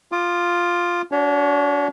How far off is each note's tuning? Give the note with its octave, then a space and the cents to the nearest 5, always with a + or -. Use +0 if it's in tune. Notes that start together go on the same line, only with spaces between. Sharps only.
F4 +5 D6 +45
D4 -35 F#4 +0 C#5 +0